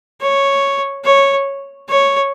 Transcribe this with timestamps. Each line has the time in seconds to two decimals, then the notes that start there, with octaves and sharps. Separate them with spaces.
0.21 C#5
1.04 C#5
1.89 C#5